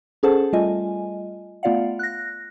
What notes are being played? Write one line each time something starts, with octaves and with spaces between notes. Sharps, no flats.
C#4 G#4 A4 C5 F#5 A5
G3 A3 F4 D#5 G#5
A3 B3 F4 D5 F5 F#5
F#6 A#6